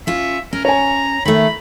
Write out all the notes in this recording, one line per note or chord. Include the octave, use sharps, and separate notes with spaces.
C#4 F4 E5
C#4 A#4
C#5 G#5 A#5
D#3 A3 B5